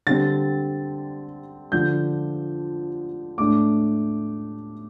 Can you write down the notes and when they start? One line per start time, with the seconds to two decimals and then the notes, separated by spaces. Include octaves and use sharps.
0.07 D3 G3 C4 A6
1.72 D3 F3 D4 G6
3.38 A2 A3 D4 D6